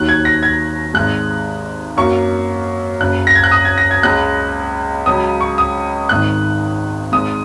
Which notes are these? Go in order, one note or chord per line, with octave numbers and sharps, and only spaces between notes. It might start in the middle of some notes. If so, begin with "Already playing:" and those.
Already playing: D#2 D#3 F#3 F#6
G#6
A#6
G#6
G#1 G#2 G#3 F#6
F#2 F#3 A#3 C#6
F#1 F#2 C#3 F#6
A#6
G#6
F#6
D#6
G#6
A#6
G#6
C#2 C#3 G#3 F#6
C#2 C#3 F#3 D#6
C#6
D#6
G#1 G#2 D#3 F#6
G#1 G#2 G#3 D#6